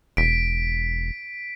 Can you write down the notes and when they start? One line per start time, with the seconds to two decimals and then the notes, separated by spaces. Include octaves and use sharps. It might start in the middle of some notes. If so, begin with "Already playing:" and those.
0.17 E1 B6 D7